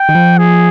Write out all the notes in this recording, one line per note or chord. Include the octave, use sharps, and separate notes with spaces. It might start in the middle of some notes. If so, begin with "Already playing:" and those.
Already playing: G5
D#3
F3
G#4